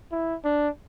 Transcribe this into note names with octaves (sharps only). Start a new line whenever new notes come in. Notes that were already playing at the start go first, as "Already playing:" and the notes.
E4
D4